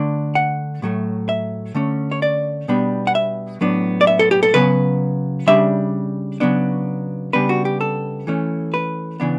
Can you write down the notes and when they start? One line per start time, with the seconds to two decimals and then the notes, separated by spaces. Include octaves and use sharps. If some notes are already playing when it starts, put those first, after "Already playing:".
Already playing: D3 A3 D4
0.35 F#5
0.82 A2 F#3 A3
1.29 E5
1.75 D3 A3 C#4
2.11 C#5
2.22 D5
2.68 B2 G3 B3 D4
3.07 F#5
3.15 E5
3.61 A2 F#3 B3 D4
4.01 D5
4.07 E5
4.19 A4
4.31 G4
4.43 A4
4.54 C#3 F#3 B3 B4
5.47 C#3 G3 D4 E5
6.40 C#3 F#3 B3 D4
7.33 C#3 G3 B3 D4 B4
7.49 F#4
7.65 G4
7.81 A4
8.27 E3 A3 C#4
8.74 B4
9.20 C#3 E3 B3 D4